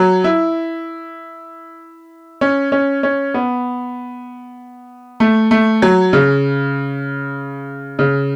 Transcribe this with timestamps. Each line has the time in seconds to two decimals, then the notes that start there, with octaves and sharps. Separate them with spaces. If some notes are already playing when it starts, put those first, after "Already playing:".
Already playing: F#3
0.24 E4
2.41 C#4
2.72 C#4
3.03 C#4
3.34 B3
5.20 A3
5.51 A3
5.82 F#3
6.13 C#3
7.99 C#3